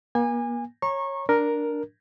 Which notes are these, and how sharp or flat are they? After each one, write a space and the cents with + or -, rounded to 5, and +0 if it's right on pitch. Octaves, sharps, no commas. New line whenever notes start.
A#3 +45 G#5 -25
C#5 -15 A#5 +0 C#6 -25
D4 +0 A#4 +5